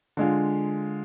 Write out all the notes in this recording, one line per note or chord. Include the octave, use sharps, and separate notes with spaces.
D3 G#3 F4